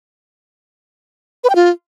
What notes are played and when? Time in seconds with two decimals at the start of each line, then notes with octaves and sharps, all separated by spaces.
1.44 B4
1.50 G5
1.55 F4